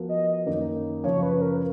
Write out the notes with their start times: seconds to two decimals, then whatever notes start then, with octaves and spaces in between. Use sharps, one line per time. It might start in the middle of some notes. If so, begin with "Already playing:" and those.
Already playing: F3 B3 F#4 A#4
0.09 D#5
0.46 F#2 D#3 A#3 D#4
1.03 F#2 C#3 F3 C#5
1.23 B4
1.42 A#4